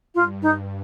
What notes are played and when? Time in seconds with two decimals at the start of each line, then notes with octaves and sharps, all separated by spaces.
0.14 G2 F4
0.42 D#4